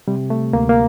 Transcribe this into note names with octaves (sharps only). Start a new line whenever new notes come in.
C3 G3
A3
D2 A#3
A#3